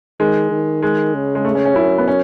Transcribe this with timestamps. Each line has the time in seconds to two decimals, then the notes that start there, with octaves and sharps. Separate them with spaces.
0.20 D#3 G#3
0.51 D#3
0.83 G#3
1.14 C#3
1.35 G#3
1.45 A3
1.55 C#4
1.66 C#4
1.76 F#2 E4
1.98 B3
2.08 C#4